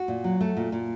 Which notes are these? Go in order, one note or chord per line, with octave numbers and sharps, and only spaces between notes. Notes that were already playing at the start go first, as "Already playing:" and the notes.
Already playing: F#4
A#2
F#3
A3
A#2
A#2